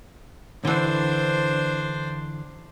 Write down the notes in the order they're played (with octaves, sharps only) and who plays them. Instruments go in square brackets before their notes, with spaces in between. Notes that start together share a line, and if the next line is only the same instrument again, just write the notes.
[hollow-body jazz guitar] D3 E3 [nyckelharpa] D4 C5